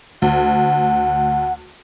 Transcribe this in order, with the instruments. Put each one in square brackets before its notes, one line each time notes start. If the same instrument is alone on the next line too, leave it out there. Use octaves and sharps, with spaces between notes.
[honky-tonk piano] D2 [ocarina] F#5